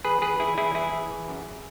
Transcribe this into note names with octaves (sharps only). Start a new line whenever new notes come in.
E3 G#4 B4
E3 G#4 B4
E3 E4 G#4
E3 E4 G#4
E3 E4 G#4
E3
E3
F#2